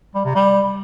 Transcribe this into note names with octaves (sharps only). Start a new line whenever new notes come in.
G3
C3
G3